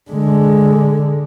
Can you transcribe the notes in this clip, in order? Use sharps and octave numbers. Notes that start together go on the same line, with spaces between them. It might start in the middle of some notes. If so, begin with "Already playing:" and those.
D3 G#3